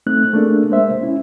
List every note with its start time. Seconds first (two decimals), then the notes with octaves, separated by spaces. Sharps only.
0.07 A3 C4 D#4 F#6
0.33 A3 A#3 D4 G#4
0.69 G#3 A#3 C5 E5
1.01 C#4 E4